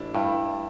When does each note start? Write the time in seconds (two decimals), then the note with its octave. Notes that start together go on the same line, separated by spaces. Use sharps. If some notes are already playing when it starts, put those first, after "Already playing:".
Already playing: A1 D4 E4
0.15 G2 E4